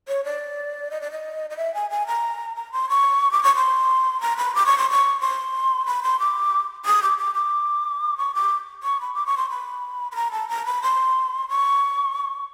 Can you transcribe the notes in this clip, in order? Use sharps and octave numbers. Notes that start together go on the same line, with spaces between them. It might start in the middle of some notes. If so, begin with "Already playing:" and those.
C#5
D5
D#5
D5
D#5
D#5
E5
G#5
G#5
A#5
A#5
C6
C#6
D6
C#6
C6
A#5
B5
D6
C#6
C6
C#6
C6
B5
C6
D6
D#6
D6
D6
D6
C#6
D6
C#6
B5
D6
C#6
C6
B5
B5
A#5
A5
A#5
B5
C6
C#6